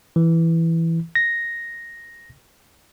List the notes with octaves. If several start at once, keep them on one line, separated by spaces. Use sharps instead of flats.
E3
A#6